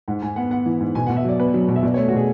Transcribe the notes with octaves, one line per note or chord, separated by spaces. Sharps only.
G#2 F#5
G#2 G#5
B3 F#5
B3 F#5
E3
G#2
B2 G#5
B2 F#5
E5
F#3 D5
B3 B4
F#3
B2
E5
B2 D5
A3 C#5
F#4
B2 G#4